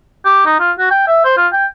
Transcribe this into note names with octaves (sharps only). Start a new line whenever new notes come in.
G4
D#4
F4
F#4
G5
E5
C5
F4
G5